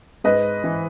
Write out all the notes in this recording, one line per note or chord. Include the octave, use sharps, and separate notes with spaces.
G#2 B4 D#5
E3